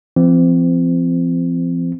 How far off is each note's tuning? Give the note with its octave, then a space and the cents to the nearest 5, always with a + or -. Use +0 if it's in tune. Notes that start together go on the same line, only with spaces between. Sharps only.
F3 -35 C4 -20